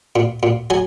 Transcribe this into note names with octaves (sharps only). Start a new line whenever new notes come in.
A#2
A#2
F#3 G#5